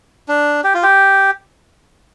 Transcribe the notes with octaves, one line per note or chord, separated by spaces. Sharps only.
D4
G4
F4
G4